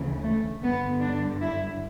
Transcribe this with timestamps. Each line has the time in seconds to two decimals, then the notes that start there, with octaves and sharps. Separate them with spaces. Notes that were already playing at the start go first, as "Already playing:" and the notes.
Already playing: D2 C#3 E3
0.23 A3
0.62 G2 D3 B3
1.00 D4
1.40 E4